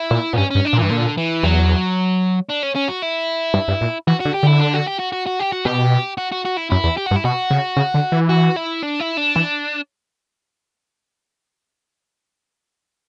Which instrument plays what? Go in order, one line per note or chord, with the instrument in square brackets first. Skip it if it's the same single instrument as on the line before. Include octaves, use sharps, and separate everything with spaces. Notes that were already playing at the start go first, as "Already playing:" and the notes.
Already playing: [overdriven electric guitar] E4
[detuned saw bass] A#2
[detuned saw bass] A#2 [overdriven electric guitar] B3
[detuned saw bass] G2 [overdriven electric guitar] C#4
[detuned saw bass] G2 [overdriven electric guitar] C#4
[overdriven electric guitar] D4
[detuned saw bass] A#2
[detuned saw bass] G2 [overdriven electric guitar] E3
[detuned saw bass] A#2 [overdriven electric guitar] D3
[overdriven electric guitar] E3
[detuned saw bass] E2 [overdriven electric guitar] F#3
[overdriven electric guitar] D4
C#4
C#4
F#4
E4
[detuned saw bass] G2
G2
A#2
[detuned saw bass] E3 [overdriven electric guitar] F#4
[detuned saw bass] D3 [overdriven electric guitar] F#4
[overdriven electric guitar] G4
[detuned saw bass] D3 [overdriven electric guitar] E4
[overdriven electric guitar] D4
F#4
G4
F#4
F#4
F#4
G4
F#4
[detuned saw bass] B2 [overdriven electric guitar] G4
[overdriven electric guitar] F#4
F#4
F#4
E4
[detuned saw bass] F#2 [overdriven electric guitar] E4
[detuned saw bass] E2
[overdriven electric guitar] G4
[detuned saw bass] G2 [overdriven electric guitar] F#4
[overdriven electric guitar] E4
[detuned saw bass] B2 [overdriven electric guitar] F#4
[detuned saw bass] C#3
C#3
D3
E3
[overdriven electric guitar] F#4
E4
D4
E4
D4
[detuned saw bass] E3